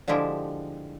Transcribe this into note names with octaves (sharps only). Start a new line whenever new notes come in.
D3 F3 G#3 E4 G4